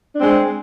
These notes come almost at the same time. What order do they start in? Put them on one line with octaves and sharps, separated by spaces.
D4 C4 G#3